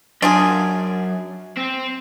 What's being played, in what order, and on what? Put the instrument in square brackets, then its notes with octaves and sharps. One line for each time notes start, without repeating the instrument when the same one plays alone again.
[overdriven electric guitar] F#2 [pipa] D4 F4 G#4
[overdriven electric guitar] C4